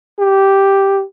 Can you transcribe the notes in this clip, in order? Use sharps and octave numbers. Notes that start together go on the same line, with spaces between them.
G4